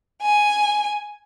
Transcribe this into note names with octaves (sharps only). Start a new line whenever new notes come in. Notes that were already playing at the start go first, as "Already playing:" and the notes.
G#5